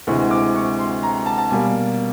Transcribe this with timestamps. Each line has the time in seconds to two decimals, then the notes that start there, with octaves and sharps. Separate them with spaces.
0.07 D2 C3 E3 G#3 C#6
0.31 D6
0.56 C#6
0.79 C6
1.03 A#5
1.26 A5
1.38 A5
1.51 B2 G3 A#3 G#5